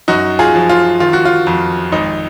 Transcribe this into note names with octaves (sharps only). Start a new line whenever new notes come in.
F#2 D#4 F#4
F4 G#4
F3
F4
D#3 F4
F#4
F4
F2
G#1 D#4